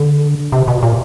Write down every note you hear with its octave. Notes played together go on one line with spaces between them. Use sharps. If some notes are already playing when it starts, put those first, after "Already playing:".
Already playing: D3
C3
B2
A#2